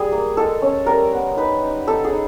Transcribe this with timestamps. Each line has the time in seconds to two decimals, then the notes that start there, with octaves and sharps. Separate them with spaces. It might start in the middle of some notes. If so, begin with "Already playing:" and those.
Already playing: G3 G#4
0.12 A#3
0.37 G#3 A4
0.62 C#4
0.86 G3 A#4
1.12 B3
1.37 D#4 B4
1.62 D#4
1.88 D#4 A4
2.04 G#4
2.12 D#4